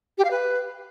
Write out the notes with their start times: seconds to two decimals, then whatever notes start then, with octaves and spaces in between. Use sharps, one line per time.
0.18 G4
0.24 F5
0.31 B4